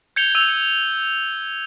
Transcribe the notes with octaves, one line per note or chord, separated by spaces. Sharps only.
G6 G#6 C#7 F7 G7
E6 D#7 F7